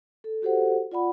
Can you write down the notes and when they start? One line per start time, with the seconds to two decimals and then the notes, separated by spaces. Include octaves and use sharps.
0.24 A4
0.42 F#4 G4 A4 C5 F#5
0.92 F4 D5 F#5 B5